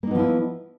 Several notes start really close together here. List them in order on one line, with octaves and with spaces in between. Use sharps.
A#3 D#4 B3 F3 E4